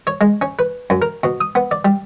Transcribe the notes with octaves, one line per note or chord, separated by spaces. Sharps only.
C#5
G#3
C#4
B4
F#2
A#4
B2
D#6
B3
D5
G3